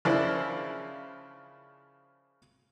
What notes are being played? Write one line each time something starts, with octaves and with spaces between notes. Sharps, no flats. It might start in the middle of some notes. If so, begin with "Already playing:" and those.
C#3 F3 D4 E4 A#4